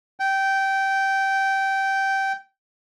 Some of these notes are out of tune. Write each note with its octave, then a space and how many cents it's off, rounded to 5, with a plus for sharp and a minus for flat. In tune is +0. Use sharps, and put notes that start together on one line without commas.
G5 -15